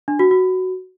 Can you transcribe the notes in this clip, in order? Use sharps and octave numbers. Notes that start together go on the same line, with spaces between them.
D4
F#4
F#4